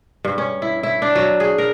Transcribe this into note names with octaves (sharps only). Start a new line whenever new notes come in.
G2
C#4
E4
E4
D4
F#3
G#4
A#4